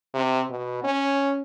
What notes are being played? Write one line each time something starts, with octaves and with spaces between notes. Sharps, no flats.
C3
B2
C#4